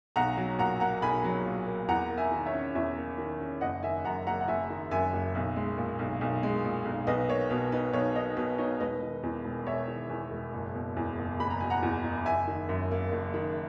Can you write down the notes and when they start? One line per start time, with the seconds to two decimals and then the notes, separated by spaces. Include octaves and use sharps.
0.16 B1 F#5 A#5
0.37 F#3
0.58 A#2 F#5 A#5
0.80 A#3 F#5 A#5
1.02 B1 G#5 B5
1.24 F#3
1.46 A#2
1.67 A#3
1.88 E2 F#5 A#5
2.10 A#3
2.18 E5 G#5
2.31 D#3
2.46 C#5 E5
2.54 C#4
2.75 E2 C#5 E5
2.97 A#3
3.18 D#3
3.40 C#4
3.61 F#1 D#5 F#5
3.83 D#3 E5 G#5
4.05 F#2 F#5 A#5
4.27 F#1 F#5 A#5
4.41 F#5
4.48 F#1 E5 G#5
4.70 D#3
4.91 F#2 E5 G#5
5.13 F#1
5.35 B1
5.56 G#3
5.78 A#2
5.99 B1
6.21 B1
6.43 G#3
6.65 A#2
6.85 B1
7.07 B1 B4 D#5
7.29 A#3 C#5
7.50 B2 B4
7.72 D#4 B4
7.93 B1 C#5
8.15 A#3 B4 D#5
8.37 B2 B4
8.58 D#4 C#5
8.80 E1 B4 D#5
9.03 D#3
9.23 E2
9.45 E1
9.67 E1 C#5 E5
9.88 D#3
10.10 E2
10.31 E1
10.53 F#1
10.74 B2
10.96 E2
11.19 F#1
11.40 F#1 B5
11.50 A#5
11.60 B2 G#5
11.70 F#5 A#5
11.83 E2
12.05 F#1
12.26 F#1 E5 G#5
12.47 D#3
12.69 F#2
12.91 A#3
13.12 F#1
13.34 D#3